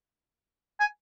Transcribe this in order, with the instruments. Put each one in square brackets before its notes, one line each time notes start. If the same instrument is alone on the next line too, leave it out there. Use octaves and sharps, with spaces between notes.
[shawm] G#5